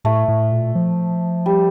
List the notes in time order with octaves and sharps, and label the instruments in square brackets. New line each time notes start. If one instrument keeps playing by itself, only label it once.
[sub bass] A2 [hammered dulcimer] A3
[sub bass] A2
A#2
F3
[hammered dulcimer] G3